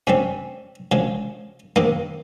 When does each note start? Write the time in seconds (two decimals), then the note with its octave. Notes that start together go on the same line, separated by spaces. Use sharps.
0.07 C3 G3 C4 C#4
0.92 C#3 F3 G#3
1.76 C3 D#3 A#3 D#4